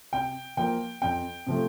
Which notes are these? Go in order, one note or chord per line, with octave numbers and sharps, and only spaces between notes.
C3 G5
F3 A#3 G5
F2 G5
C3 F3 A3